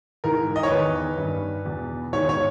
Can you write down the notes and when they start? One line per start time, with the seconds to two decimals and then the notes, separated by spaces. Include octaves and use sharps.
0.24 G#2 E3 A#4
0.56 D#5
0.63 C#5
0.70 E2 D#3 B4
1.18 G2 D#3
1.65 E2 B2
2.13 G#2 D#3 C#5
2.29 C#5